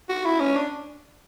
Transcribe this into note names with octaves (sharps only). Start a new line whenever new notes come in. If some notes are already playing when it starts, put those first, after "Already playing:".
F#4
E4
C#4
D4